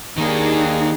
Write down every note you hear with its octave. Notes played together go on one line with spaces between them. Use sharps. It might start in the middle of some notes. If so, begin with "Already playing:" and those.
D#3 A#3 D4 D#4 G#4